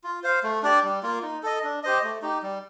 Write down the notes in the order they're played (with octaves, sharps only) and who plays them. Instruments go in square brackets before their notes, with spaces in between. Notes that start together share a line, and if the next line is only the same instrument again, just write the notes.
[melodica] F4
C5 F5
A3
D4 G4 D5
G3
A#3 F4
D#4
A4 D#5
D4
G4 C5 D#5
A3
D#4 G4
G3